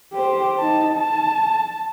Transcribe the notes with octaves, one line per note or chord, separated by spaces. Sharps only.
G4 C5
D#4 A5
A5